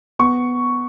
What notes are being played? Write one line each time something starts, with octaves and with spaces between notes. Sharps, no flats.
B3 C#6